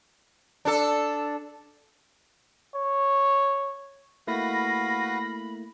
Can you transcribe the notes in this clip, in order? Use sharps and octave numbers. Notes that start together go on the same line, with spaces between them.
D4 A4
C#5
A3 A#3 E4 F#4 B4 F5 B5 A#6